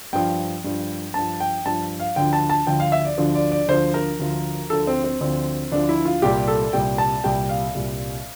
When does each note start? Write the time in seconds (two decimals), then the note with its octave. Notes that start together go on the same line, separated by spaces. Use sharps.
0.13 G2 F3 G5
0.64 G2 F3
1.14 G2 F3 A5
1.40 G5
1.65 G2 F3 A5
2.00 F5
2.16 D2 D3 F3 G5
2.33 A5
2.50 A5
2.67 D2 D3 F3 G5
2.80 F5
2.92 E5
3.05 D5
3.18 D2 D3 F3
3.35 D5
3.52 D5
3.68 D2 D3 F3 C5
3.94 A#4
4.19 D2 D3 F3
4.70 D2 D3 F3 A4
4.87 C4
5.04 C4
5.21 D2 D3 F3 C4
5.72 D2 D3 F3 D4
5.89 E4
6.05 F4
6.22 C2 A#2 G3 G4
6.48 A4
6.73 C2 A#2 G3 G5
6.98 A5
7.24 C2 A#2 G3 G5
7.49 F5
7.75 C2 A#2 G3